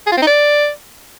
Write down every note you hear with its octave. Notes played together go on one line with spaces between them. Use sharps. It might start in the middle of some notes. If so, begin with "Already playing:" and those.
G#4
F4
C4
D#4
D5